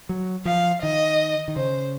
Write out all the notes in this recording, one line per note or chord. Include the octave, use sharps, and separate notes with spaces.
F#3
F3 F5
D#3 D#5
D#3
C#3 C5